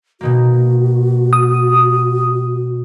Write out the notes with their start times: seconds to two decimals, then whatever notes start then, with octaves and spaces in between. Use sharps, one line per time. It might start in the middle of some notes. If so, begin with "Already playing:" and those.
0.21 B2 D#3 A#3 F#4
1.33 D#6